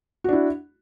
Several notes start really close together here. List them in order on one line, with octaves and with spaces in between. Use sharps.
F#4 D4 E4